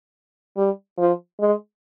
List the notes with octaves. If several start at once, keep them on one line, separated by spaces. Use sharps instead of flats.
G3
F3
G#3